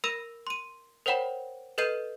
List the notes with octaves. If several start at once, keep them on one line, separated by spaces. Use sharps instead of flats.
A#4 B5 E6 A#6 D#7
C6 D#7
A#4 C5 C#5 F#5 G5 B5
A4 B4 D#5 G6 C7 D#7